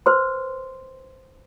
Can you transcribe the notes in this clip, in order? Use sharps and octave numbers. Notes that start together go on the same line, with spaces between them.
B4 C5 C6